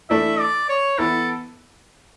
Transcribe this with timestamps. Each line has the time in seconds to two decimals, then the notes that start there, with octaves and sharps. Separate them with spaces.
0.10 E3 A3 D4 A4 E5
0.40 D5
0.69 C#5
0.98 E3 B3 E4 A4